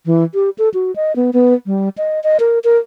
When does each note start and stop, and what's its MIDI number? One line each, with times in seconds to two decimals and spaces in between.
0.06 0.23 52
0.34 0.50 67
0.58 0.69 69
0.74 0.94 66
0.96 1.15 75
1.16 1.31 59
1.33 1.54 59
1.66 1.89 55
1.98 2.22 75
2.24 2.38 75
2.40 2.59 70
2.64 2.78 70